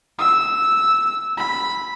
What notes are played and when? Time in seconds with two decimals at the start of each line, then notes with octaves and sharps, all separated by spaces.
0.19 E6
1.37 B5